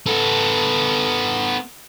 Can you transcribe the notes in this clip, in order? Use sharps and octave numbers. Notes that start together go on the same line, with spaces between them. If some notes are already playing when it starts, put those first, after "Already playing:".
B3 A4